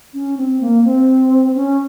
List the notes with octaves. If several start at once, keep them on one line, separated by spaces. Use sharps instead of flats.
C#4
C4
A#3
C4
C#4